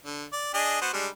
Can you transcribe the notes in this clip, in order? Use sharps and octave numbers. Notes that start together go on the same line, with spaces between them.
D3
D5
D4 G#4 D#5
B3 F#4 C5
G3 G#3 D4